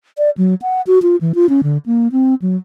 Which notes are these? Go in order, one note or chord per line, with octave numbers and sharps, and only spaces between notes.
D5
F#3
F#5
F#4
F4
E3
F4
C#4
D3
A#3
C4
F#3